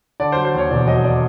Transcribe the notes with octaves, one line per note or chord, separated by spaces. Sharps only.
D3 D5
C5
F#3
C5
D#2 C#5
E1 D5
F#3 D#5
D5